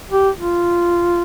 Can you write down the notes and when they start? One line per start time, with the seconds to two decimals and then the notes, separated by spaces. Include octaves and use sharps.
0.11 G4
0.38 F4